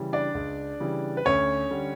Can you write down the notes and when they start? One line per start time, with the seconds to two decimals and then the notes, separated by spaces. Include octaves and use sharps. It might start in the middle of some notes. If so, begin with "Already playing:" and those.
Already playing: C#3 E3 G3
0.13 D4 D5
0.35 C#2
0.80 C#3 E3 G3
1.17 B4
1.25 D2 C#4 C#5
1.71 D3 G3